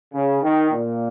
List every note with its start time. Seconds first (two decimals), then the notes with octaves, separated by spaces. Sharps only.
0.14 C#3
0.42 D#3
0.71 A#2